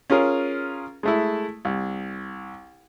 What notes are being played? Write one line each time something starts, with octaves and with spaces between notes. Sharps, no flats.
C#4 F4 G#4 A#4
G#3 A3 E4
C2